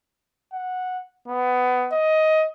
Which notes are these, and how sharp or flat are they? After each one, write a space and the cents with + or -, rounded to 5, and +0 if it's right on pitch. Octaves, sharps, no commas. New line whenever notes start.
F#5 -10
B3 +20
D#5 +15